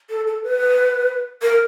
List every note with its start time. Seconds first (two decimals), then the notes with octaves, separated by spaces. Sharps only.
0.10 A4
0.27 A4
0.43 B4
1.42 A#4